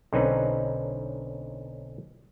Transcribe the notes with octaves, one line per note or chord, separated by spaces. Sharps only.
B1 D3 C4 C#4 D#4 B4